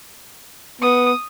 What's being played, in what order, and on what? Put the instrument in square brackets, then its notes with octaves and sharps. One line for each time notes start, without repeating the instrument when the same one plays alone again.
[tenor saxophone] B3 [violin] D#6